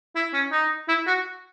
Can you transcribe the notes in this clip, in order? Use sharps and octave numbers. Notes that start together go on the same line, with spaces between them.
E4
C#4
D#4
E4
F#4